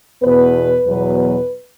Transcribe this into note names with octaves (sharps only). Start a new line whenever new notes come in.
E2 B2 B3 B4
E2 B2 F#3 B4
B4